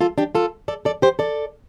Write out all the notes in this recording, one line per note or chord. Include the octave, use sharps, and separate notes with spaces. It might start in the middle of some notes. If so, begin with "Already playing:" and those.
F4 A4
D4 G4
F4 A4
A4 D5
A4 D5
G4 C5
A4 D5